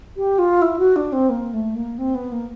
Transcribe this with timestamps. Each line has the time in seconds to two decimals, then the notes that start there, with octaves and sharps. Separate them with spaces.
0.17 G4
0.38 F4
0.62 E4
0.79 F#4
0.96 D4
1.12 C4
1.29 A#3
1.53 A3
1.75 A#3
1.98 C4
2.15 B3
2.32 A#3